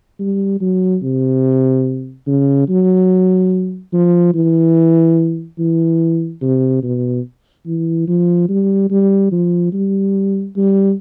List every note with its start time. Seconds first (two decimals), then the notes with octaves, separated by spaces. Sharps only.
0.19 G3
0.61 F#3
1.03 C3
2.27 C#3
2.69 F#3
3.93 F3
4.34 E3
5.59 E3
6.42 C3
6.83 B2
7.66 E3
8.08 F3
8.49 G3
8.90 G3
9.32 F3
9.73 G3
10.56 G3